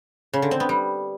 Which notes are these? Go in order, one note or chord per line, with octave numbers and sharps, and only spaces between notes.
C#3
D3
C4
B3
G3